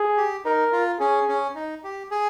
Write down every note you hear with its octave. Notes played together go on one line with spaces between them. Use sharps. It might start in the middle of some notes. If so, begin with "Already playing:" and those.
Already playing: G#4
G4
D#4 A#4
F4
C#4 G#4
C#4
D#4
G4
G#4